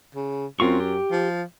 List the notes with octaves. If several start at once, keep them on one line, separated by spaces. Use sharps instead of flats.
C#3
F#2 C4 F4 C#6
G4
F3